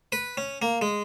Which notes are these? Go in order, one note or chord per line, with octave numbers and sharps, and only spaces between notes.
B4
C#4
A#3
G#3